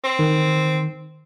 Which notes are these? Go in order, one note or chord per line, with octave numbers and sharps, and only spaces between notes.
C4
D#3